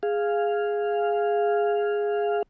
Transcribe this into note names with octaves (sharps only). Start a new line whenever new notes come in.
G#4 F5